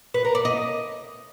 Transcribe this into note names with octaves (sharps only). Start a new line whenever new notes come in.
B4
A#4
D5
D#5